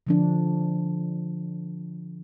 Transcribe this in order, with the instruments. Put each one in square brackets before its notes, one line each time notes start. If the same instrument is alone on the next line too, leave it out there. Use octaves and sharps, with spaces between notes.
[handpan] D3 F3 D4